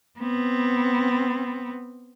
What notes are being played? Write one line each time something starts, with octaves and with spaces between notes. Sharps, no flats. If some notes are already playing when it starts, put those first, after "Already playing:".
B3 C4